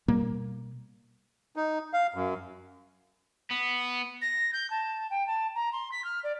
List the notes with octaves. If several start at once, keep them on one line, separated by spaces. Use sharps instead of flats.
B2 G3 A#3
D#4
F5
F#2
B3
A#6
G6
A5
G5
A5
A#5
C6
B6
F6
D5